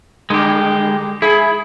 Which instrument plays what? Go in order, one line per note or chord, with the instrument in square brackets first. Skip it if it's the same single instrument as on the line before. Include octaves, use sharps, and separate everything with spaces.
[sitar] D3 G3 [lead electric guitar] G#3 G4
[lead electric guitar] E4 [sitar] G#4